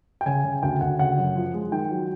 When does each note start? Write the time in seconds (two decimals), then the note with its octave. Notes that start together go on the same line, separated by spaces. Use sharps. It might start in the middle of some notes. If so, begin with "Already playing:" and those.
0.21 G5
0.26 C#3 G#5
0.44 C#3
0.63 D2 G5
0.81 D2 F#5
0.99 C#3 F#5
1.18 F#2
1.36 F3
1.54 G#3
1.72 D#3 G5
1.91 F#3